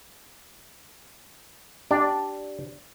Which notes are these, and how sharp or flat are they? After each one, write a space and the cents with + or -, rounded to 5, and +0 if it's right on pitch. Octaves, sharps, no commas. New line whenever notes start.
D4 +0 G4 -15 D5 +0